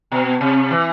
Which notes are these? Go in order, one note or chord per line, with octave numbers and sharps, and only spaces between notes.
B2
C3
E3